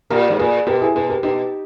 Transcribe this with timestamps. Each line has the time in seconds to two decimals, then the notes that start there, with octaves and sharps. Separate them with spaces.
0.10 A#2 G4 A#4
0.30 G#2
0.39 A#2 G#4 B4
0.67 B2 G4 A#4
0.81 E4 G#4
0.95 B2 G#4 B4
1.09 G4 A#4
1.23 B2 D#4 G4